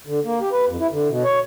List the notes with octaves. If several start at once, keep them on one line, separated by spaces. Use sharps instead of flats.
D3
A#3
G4
B4
F2
E4
D3
B2
C#5